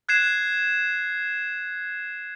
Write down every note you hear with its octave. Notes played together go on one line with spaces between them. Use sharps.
F#6 G#6 C7 E7